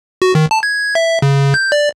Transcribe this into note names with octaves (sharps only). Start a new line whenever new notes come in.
F#4
D#3
A5
G#6
E5
C#3
G6
D5